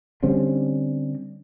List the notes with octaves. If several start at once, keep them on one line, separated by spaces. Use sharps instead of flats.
D3 G3 C4 C#4